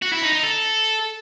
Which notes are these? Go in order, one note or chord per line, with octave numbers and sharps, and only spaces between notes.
F#4
E4
D#4
D#4
A4